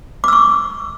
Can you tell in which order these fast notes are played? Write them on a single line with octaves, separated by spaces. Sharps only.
D6 E6 C#6